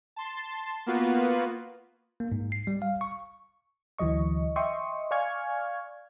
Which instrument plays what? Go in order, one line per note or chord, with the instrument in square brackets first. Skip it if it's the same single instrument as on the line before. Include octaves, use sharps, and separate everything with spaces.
[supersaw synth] A5 C6
A#3 B3 F4 F#4 B4
[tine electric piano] A#3
G#2
C7
G3
F5
C#6
[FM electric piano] D2 E3 F#3 D#5 C#6
D#5 E5 G5 C6 C#6 D#6
D5 F5 G#5 C#6 F6 G#6